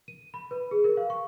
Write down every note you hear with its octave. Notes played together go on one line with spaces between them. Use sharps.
D#7
B5
B4
G#4
A#4
F5
C#6